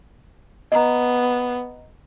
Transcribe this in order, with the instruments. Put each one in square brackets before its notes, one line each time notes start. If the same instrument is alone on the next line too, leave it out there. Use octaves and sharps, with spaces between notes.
[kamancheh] B3 [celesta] D#5 A#5